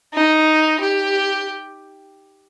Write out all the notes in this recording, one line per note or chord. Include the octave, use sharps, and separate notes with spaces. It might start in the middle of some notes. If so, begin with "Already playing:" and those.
D#4
G4